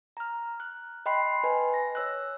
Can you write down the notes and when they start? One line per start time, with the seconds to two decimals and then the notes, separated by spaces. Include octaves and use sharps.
0.17 A#5 F6
0.60 F#6
1.06 D#5 G5 B5 C6 F#6 C7
1.44 B4 D#5 G#5
1.74 A#6
1.95 C#5 E6 F#6